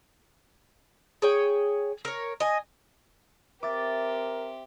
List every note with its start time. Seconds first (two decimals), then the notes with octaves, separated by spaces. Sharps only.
1.22 G#4 C#5 G5
2.05 A#4 C#5
2.40 D#5 G#5
3.63 C4 G4 A#4 E5 D6 A6